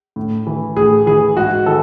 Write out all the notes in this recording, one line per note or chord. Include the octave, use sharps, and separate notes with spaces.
A2
E3
A2 G#4
E3 G#4
G#2 F#4
E3 A4